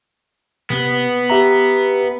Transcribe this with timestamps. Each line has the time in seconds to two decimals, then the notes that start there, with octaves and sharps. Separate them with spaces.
0.70 C3 B3
1.30 G4 E5 A#5